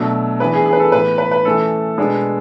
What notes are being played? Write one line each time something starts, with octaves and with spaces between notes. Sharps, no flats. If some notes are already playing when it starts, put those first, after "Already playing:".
Already playing: B2 F#3 A3 D4
E3 B3 D4 B4
G#4
G#4
B4
A4
A2 E3 B3 B4
B4
B4
E3 A3 C#4 A4
B2 G#3 B3 D4